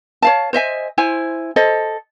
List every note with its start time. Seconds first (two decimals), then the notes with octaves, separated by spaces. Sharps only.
0.22 C#5 F5 A5
0.53 C5 D#5 E5 G#5
0.98 E4 C5 G#5
1.56 A4 C5 D#5